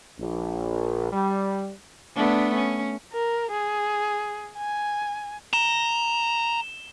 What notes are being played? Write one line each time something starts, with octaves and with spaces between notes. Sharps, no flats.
A#1
G3
A3 B3 D4
C#4
A#4
G#4
G#5
A#5 E7 G7